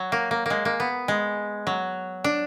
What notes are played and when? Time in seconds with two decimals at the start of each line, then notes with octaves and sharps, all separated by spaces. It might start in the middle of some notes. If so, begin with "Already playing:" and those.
Already playing: F#3
0.12 A#3
0.31 A#3
0.46 G#3 A#3
0.65 A#3
0.80 B3
1.08 G#3
1.67 F#3
2.24 D4